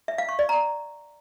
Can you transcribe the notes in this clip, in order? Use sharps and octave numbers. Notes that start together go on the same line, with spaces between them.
E5
F5
C#6
D5
A#5